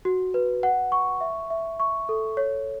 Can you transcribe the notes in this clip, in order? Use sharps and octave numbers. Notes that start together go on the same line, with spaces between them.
F#4
B4
F#5
C#6
E5
E5
C#6
A4
C#5